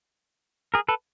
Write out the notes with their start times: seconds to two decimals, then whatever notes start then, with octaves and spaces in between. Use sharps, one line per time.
0.74 G#4 A#4
0.89 A4 B4